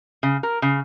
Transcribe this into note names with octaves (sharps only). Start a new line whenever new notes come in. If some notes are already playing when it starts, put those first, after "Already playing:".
C#3
A#4
C#3